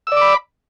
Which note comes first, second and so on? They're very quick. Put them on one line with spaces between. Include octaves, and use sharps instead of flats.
E6 D5 D6 B5